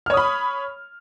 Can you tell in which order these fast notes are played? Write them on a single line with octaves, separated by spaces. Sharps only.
F6 C#5 D#6 B5